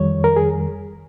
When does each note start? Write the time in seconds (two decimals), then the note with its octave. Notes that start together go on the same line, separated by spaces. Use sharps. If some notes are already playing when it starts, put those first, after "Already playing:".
Already playing: F2 D#3 G3 C#5
0.24 A#4
0.36 G#4